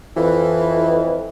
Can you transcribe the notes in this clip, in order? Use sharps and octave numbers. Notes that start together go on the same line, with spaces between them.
F2 E3